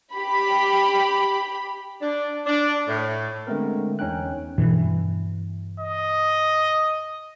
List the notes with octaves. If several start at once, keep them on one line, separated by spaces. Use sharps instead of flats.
G4 B5
D4
D4
A2
D3 G#3 A3 B3 C4 A#4
E2 C#4 D#4 G5 F#6
G2 B2 E3
D#5